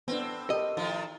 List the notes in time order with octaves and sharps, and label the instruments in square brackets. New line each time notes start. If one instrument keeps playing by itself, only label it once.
[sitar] A2 C4 [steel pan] B3 D4
[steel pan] G4 A4 A#4 [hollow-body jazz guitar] D#5
[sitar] A2 D#3 F3